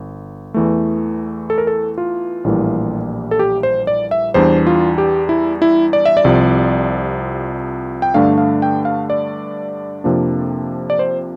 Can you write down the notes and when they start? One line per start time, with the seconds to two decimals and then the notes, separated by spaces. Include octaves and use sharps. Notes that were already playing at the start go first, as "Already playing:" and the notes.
Already playing: G1
0.54 E2 E3 A3
1.50 A4
1.58 A#4
1.67 A4
1.98 F4
2.44 A#1 A2 E3 G3 A#3
3.31 A4
3.39 G4
3.63 C5
3.87 D5
4.11 E5
4.34 E2 E3 G3 D4 C5
4.67 F4
4.98 G4
5.29 E4
5.62 E4
5.93 D5
6.05 E5
6.17 D5
6.25 C2 C3 F3
8.02 G5
8.14 G2 D3 A3 D4 F5
8.38 F5
8.62 G5
8.85 F5
9.10 D5
10.04 F2 C3 F3 A#3 D4
10.90 D5
10.99 C5